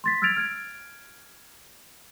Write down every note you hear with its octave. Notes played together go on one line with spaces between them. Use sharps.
C6 A6 B6
E6 F6 G#6 A6 D7 F7
F6 G#6 D7